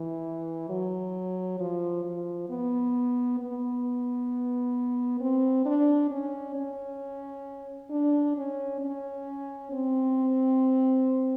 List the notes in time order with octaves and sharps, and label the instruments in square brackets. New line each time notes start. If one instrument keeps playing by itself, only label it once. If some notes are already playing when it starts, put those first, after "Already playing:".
Already playing: [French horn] E3
F#3
F3
F3
B3
B3
C4
D4
C#4
C#4
D4
C#4
C#4
C4